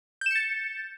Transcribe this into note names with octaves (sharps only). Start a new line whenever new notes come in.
G6 A6 C#7 E7